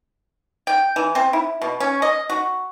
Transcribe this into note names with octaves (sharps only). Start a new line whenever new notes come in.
G5
E3
C4
E4
B2
C#4
D#5
F#4